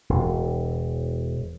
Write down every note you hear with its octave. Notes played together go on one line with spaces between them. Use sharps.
E1